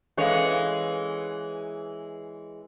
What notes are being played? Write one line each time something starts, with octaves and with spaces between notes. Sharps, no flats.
E3 G#3 C#4 A4 C#5 F5